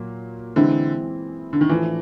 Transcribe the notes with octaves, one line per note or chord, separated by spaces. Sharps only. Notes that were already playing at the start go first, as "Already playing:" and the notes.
Already playing: A#2 F#3 A#3
D3 E3 G#3 C4 E4
D3
D#3
A2 E3 F3 A3 D4